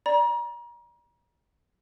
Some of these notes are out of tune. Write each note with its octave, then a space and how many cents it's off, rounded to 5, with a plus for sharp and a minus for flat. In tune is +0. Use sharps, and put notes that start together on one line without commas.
D5 +0 A#5 +35